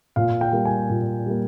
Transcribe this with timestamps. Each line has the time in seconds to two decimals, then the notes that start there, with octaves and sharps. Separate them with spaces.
0.16 A#2 F5
0.41 G5
0.52 G3 A#3
0.65 G#5
0.89 A#2
1.26 G3 A#3